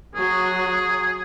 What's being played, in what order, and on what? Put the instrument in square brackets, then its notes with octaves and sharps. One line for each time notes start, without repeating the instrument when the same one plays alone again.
[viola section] F#3 [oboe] G#4